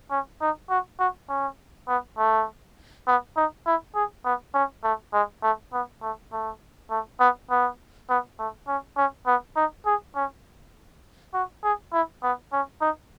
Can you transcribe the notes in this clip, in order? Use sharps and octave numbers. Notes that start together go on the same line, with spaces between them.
C#4
D#4
F#4
F#4
C#4
B3
A3
B3
D#4
E4
G#4
B3
C#4
A3
G#3
A3
B3
A3
A3
A3
B3
B3
B3
A3
C#4
C#4
B3
D#4
G#4
C#4
F#4
G#4
E4
B3
C#4
D#4